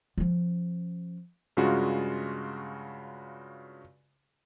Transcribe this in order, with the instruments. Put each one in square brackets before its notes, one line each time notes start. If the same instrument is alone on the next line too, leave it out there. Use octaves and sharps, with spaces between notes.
[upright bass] F3 C#4
[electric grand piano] G2 C#3 G#3 F4 F#4